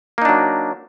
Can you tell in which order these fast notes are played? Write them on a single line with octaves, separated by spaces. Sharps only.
A#3 D#4 D4 F#3